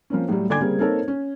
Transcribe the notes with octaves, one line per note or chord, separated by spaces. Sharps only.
F3 A#3 C4 C#4
A2 F#3 G3
A#2 D3 G#5 D6 G#6
C#3 G3 A#3 C4
A#3 C4 D#4 A4 A#4 C#5
C#4